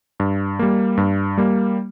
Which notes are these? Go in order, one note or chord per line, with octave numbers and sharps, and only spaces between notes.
G2
G3 A#3
G2
G3 A#3